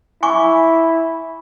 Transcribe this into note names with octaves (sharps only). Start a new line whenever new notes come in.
E4 G#5 C#6 D6